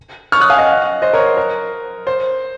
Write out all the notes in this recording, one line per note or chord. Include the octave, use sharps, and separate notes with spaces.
C#6 F6
D#6 F#6
F5 G#5
D#5 F#5
C5 D#5
A#4 C#5
C5
A#4
C5